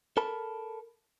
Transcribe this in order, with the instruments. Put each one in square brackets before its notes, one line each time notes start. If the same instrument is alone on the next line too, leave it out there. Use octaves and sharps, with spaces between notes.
[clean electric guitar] A4 A#4 A5 B5